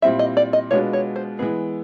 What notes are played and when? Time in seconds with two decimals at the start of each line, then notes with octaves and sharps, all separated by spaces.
0.02 A#2 G3 C4 E4 E5
0.19 D#5
0.37 D5
0.53 D#5
0.71 B2 G#3 B3 D4 F4 C#5
0.93 C#5
1.16 C5
1.39 E3 G#3 B3 G#4